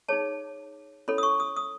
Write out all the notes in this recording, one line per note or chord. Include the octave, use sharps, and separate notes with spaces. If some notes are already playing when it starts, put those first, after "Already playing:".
D#4 G#4 C#5 A5
C#4 E4 A4 C#5 B5
D#6
C#6
D#6
D#6